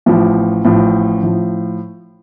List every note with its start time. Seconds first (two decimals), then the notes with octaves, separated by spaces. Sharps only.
0.06 A1 A2 F3
0.64 A1 A2 F3
1.23 A2 F3